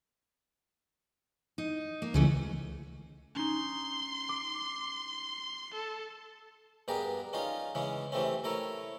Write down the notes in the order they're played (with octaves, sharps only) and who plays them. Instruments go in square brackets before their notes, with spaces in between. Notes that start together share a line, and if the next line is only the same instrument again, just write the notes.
[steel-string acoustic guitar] D#4
A#3
[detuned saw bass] C#2 [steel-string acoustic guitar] E3 A3 C#4
[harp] C#4 D#4 [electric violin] C6
[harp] D6
[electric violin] A4
[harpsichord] G2 B3 G4 G#4 A#4
C#4 D#4 F4 F5
C#3 E3 G#3 C#4
C3 E3 A3 C4 C#4
A3 E4 A#4 C#5